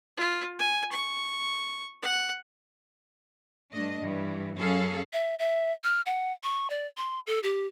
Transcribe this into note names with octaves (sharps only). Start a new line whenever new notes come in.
F4
G#5
C#6
F#5
G2 A3 D4 D#5
G2 E3
F#2 C#4 G#4 A4 F5
E5
E5
F6
F#5
C#6
D5
C6
A4
G4